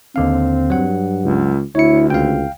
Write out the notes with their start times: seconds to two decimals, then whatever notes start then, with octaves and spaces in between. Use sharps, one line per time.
0.16 D#2 D3 C4 F5
0.70 G2 F#3 F#5
1.24 C#2
1.75 D2 E4 C#5 C#7
2.10 C#2 F5 G5